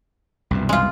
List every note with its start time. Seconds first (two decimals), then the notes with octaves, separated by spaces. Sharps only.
0.51 C2 F#2 B2
0.69 G#3 F4